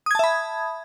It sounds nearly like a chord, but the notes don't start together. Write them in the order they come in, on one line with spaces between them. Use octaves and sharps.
D#6 G#6 A5 E5 B5